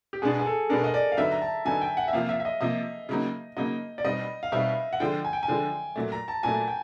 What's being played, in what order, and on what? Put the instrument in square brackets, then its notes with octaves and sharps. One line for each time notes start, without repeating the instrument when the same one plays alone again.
[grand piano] G4
[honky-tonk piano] B2 G#3 B3 D4 [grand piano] G#4
[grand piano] G#4
A4
[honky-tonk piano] B2 G#3 B3 D4 [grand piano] A#4
[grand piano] D#5
D5
F5
[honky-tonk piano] D3 F#3 B3 D#4 [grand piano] E5
[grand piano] A#5
A5
[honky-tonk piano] D3 F#3 B3 D#4 [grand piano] G#5
[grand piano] G5
F#5
E5
[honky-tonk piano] C3 F3 A#3 [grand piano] F5
[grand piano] E5
E5
D#5
[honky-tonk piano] C3 F3 A#3 [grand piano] D#5
[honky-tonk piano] C#3 F#3 A#3 D#4
[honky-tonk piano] C#3 F#3 A#3 D#4 [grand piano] D#5
[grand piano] D5
[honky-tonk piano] B2 G3 C4 D#4 [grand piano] D#5
[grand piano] F5
[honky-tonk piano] B2 G3 C4 D#4 [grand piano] E5
[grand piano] F#5
[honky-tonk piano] D3 F3 G#3 [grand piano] G5
[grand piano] G#5
G5
G#5
[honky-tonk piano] D3 F3 G#3
A#2 F#3 A3
[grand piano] A#5
A5
[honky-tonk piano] A#2 F#3 A3 [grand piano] G#5
[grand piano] G5